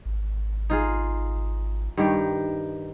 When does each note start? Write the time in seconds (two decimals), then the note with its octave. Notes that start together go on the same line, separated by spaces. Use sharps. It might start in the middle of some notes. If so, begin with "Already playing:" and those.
0.06 G#1
0.70 D#4 F4 G#4
1.97 G2 D#3 G4